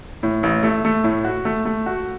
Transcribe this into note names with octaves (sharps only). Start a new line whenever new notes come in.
A2
A1
A3
A3
A2
F#4
A3
A3
F#4